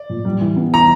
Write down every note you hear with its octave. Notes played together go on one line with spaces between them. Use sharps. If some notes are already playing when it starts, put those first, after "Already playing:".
Already playing: D5
A#2
G3
E3
B3
E3 A#5